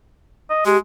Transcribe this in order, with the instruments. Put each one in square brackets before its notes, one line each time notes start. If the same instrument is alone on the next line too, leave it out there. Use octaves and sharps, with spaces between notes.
[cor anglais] D#5
[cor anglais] G#3 [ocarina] G4